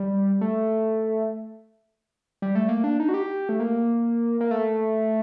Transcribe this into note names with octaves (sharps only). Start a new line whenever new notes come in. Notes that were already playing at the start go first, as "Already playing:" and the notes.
Already playing: G3
A3
G3
A3
A#3
D4
D#4
F#4
G4
A3
A#3
A#3
A3